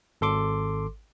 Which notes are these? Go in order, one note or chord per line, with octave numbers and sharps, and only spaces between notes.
G#1 A4 C6 D6